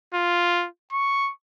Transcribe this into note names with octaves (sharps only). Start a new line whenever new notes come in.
F4
C#6